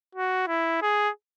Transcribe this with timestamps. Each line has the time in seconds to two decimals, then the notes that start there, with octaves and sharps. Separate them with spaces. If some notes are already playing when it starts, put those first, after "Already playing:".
0.15 F#4
0.48 E4
0.82 G#4